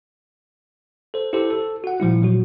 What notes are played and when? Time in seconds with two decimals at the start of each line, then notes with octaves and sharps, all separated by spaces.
1.14 A4 C5
1.33 E4 G4 A4 C5
1.50 A4
1.84 F#4 F#5
2.00 A#2 F3 G3 E4
2.22 A#2 F#3 F#4